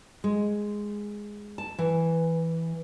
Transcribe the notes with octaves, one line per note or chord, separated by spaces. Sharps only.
G#3
A5
E3